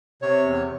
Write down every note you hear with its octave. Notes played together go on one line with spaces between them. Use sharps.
C3 C#5
E2